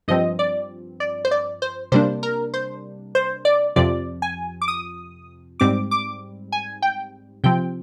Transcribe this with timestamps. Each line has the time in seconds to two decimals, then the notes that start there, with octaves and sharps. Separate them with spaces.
0.08 G2 F3 C4 D#5
0.39 D5
1.00 D5
1.25 C5
1.31 D5
1.62 C5
1.92 C3 G3 A#3 D4 C5
2.23 A#4
2.54 C5
3.15 C5
3.45 D5
3.76 F2 C3 F3 D5
4.22 G#5
4.62 D6
4.68 D#6
5.60 G#2 G3 C4 D6
5.91 D6
6.52 G#5
6.82 G5
7.44 C3 F3 C4 G5